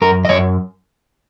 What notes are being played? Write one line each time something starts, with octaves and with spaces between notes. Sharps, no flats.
F#2 A#4
D#5
F#2 C#5